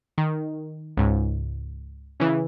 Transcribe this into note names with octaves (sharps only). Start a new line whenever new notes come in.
D#3
C#2 G#2
C#3 E3